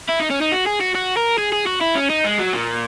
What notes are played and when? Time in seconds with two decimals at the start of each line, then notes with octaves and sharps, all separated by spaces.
0.09 E4
0.19 D#4
0.30 C#4
0.41 D#4
0.52 F#4
0.66 G#4
0.81 F#4
0.95 F#4
1.17 A#4
1.38 G#4
1.53 G#4
1.67 F#4
1.81 E4
1.95 C#4
2.10 D#4
2.24 G#3
2.39 F#3
2.53 A#2